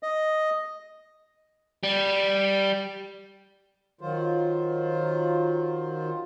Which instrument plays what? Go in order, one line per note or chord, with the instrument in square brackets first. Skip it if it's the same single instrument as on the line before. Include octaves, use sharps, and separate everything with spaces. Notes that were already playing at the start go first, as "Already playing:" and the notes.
[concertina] D#5
[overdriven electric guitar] G3
[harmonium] D#3 F#3 F4 C5